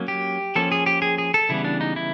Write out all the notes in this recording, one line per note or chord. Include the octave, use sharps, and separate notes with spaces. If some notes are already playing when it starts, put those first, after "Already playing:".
Already playing: F#3 A#3 C#4
G4
F3 A#3 C#4 A4
G#4
G4
G#4
G#4
A4
C#3 E3 G3 B3 E4
D4
D#4
E4